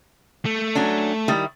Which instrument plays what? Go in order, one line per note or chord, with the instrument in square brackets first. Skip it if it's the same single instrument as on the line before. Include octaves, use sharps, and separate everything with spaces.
[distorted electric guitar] A3
[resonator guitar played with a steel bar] F#3 C#4 D4
D#3 G3 E4